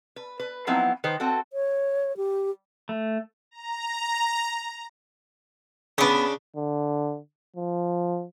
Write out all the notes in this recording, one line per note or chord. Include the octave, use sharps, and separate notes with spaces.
B4
B4
F3 F#3 B3 C4 D#4 E4
D#3 B4 C5
C4 F#4 A4
C#5
G4
A3
A#5
C#3 B3 D4 D#6
D3
F3